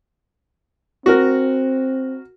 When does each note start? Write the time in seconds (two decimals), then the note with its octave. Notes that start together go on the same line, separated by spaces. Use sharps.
1.06 C4 F#4 A#4